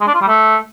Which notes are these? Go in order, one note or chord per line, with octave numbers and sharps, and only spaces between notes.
G#3
D4
F4
G3
A3